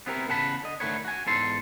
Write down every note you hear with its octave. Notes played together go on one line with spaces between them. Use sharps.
B3 C4 E4 G4 A#4
E2 C#3 F#5 A5 B5
D3 D#5
D3 D#3 A3 B3 B4 C#5
F#4 G#5
E2 G#2 A4 C6